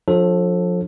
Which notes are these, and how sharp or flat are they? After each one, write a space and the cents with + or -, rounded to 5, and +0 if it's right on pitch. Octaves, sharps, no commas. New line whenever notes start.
F3 +35 D4 +5 A4 +0